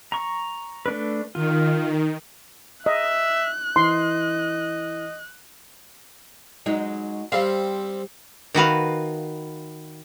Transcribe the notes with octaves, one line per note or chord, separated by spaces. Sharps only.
A#5 C#6
A3 D4 B4
D#3 F4
D#5 E5 F#6
E3 D#5 C6
F#3 G#3 D#4
G3 C4 F5
D#3 F#4 B4 F5